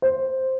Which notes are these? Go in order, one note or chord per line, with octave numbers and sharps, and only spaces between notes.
C5